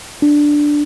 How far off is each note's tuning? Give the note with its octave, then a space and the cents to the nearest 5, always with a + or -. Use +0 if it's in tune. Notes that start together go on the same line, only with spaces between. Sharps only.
D4 +0